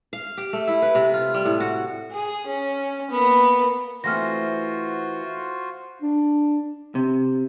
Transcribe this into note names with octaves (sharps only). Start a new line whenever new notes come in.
F5
G4
A3
E4
B4
C3
F4
G3
A2
F#4
G#4
C#4
A#3 B3
E3 A3 C4 F4 F#4 C5 F6 A#6
D4
C3